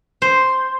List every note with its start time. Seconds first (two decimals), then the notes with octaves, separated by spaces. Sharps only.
0.22 C5